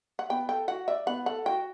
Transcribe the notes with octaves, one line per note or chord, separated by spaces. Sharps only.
F#5
B3 G5
A4 G5
F#4 F#5
D5 E5
B3 F#5
A4 F#5
F#4 G5